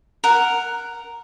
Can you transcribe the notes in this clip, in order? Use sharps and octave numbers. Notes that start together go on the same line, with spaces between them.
A#4 F#5